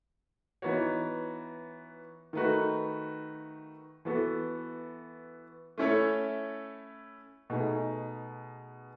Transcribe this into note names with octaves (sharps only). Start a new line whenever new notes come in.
E3 B3 D#4 F#4 C#5
D#3 A3 D#4 F#4 B4
E3 B3 F#4 A4
A3 C#4 E4 A4 C#5
B2 A3 D#4 G#4